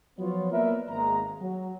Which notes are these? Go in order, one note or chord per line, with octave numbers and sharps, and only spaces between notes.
F3 F#3 B3 F4 B4 C#5
A#3 B3 A#4 B4 D5 E5
G#1 G#3 A#3 A#5
F#3